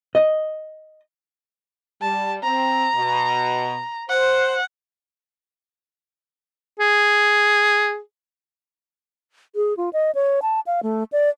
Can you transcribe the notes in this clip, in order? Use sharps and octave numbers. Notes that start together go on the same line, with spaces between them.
D#5
G3 A5
C4 A#5
B2
C5 F#5
G#4
G#4
F4
D#5
C#5
A5
F5
A3
D5